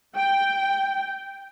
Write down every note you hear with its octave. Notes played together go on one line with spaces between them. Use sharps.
G5